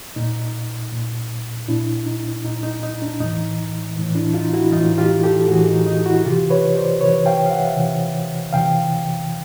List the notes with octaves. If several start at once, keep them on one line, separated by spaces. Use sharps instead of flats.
A#2 D#4
A#2
A#2 D4 E4
D#4
A#2 D#4
D#4
D#4
D4
A2 E3 D#4
A2 E3
D4 E4
D#4 F4
E4 F#4
A2 E3 D#4 F4
F4 G4
G4 A4
A2 E3 F#4 G#4
D#4
D#4
E4 F#4
C3 E3 F4 G4
B4 C#5
C5 D5
C3 E3 B4 C#5
F5 G5
F5
E5 F#5
C3 E3
C3 E3 F5 G5